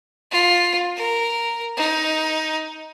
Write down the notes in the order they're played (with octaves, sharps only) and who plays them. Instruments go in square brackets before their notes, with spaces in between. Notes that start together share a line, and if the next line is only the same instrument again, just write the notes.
[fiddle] F4
A#4
D#4